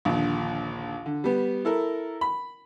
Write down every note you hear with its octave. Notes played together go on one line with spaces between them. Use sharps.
A#1 D#2 A#2 D3
D3
G3 B3
E4 A4 A#4
B5